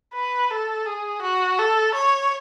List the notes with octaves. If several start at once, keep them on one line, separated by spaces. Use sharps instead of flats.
B4
A4
G#4
F#4
A4
C#5